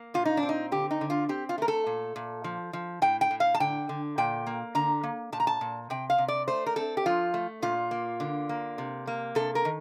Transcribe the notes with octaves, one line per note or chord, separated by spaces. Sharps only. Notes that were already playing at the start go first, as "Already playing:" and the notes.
Already playing: A#3
A#2 F4
D#4
D4
C4
D#4
D3 G4
D#4
D3
F4
C4 G4
F4
A3 A#4
A4
A#2
A#2
F3
F3
A2 G5
G5
A2
F5
A5
D3 G5
D3
A#2 G5
A#3
D3 A#5
A#3
A#2 A5
A#5
A5
A#2
C3 G5
F5
C3
D5
A3 C5
A#4
C4 A4
G4
F3 F4
A3
A#2 F4
A#3
D3
A#3
C3
A#3
C3 A4
A#4
D#3